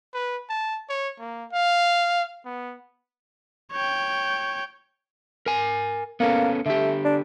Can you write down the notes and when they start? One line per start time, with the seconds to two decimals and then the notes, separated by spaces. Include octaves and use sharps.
0.14 B4
0.50 A5
0.89 C#5
1.19 A#3
1.53 F5
2.45 B3
3.72 C#5 G5
5.46 A#4 G#5
6.20 A#3 B3 C#4 A4
6.66 D3 A3 G4
7.05 D4